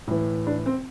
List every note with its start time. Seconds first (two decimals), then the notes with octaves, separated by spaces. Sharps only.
0.08 A2 E3
0.47 D4
0.66 C4